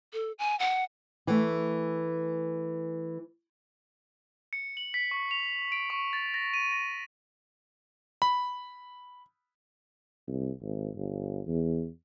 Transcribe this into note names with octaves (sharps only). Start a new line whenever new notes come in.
A4
G#5
F#5
E3 A3
C#7
F#7
B6
C#6
F7
D7
C#6
A6
A#6
D#7
A#6
B5
C2
G#1
G1
E2